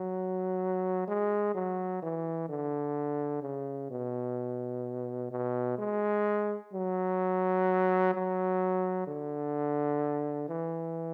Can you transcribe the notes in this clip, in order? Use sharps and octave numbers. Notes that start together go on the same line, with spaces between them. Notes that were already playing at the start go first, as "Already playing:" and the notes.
Already playing: F#3
G#3
F#3
E3
D3
C#3
B2
B2
G#3
F#3
F#3
D3
E3